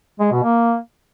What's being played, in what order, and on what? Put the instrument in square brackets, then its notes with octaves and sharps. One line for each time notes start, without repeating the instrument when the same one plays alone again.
[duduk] G#3
B2
A#3